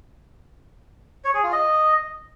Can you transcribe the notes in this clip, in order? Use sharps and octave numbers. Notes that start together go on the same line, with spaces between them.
C#5
G#4
F4
D#5